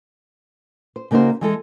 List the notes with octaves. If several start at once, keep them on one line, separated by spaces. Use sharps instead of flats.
C5
C#3 A#3 D#4 F#4 C5
E3 G#3 A4